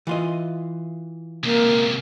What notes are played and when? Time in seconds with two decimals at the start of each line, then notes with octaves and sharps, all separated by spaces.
0.07 E3 F4 D#5
1.43 C#2 C3 A#3